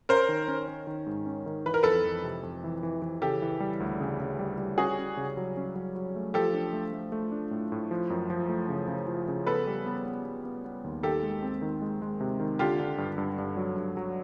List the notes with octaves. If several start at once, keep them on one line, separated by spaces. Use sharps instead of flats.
C#4 A#4 C5
D#3
C#4
C#4
D#3
G#2
C#4
D#3
E3 B4
A#4
F2 A4 B4
F2
C3
F2
E3
E3
E3
C#3 G4 A4
E3
G3
D2
C#3
C#3
G3
G3
C#4 F#4 G#4
C#4
C#3
F#3
C#4
F#3
F#3
A3
F3 G4 A4
D4
A3
A3
A3
D4
A2
A2
F3
F#2
F3
A3
C#3
C#3
F3
C#3
B3 A4 B4
G3
B3
B3
B3
B3
B3
D#2
D#3 G4 A4
G#3
C4
D#3
G#3
G#3
C3
D#3
D3 F4 G4
D3
G2
G2
G2
F#3
G2
F#3